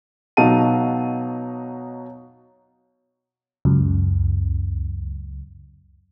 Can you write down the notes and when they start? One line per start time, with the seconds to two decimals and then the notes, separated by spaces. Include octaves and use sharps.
0.37 B2 F#3 D#4 F5 A5 D#7
3.65 C#2 F#2